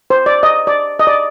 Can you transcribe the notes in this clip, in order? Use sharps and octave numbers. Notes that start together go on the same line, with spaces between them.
C5
D5
D#5
D5
D#5
D5